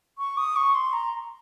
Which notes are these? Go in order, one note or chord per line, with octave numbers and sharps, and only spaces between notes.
C#6
D#6
C#6
C6
A#5